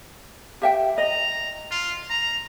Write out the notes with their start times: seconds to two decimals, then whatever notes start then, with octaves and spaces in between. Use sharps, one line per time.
0.62 G4 E5 G5
0.98 D#5 A#5
1.71 F4
2.10 A#5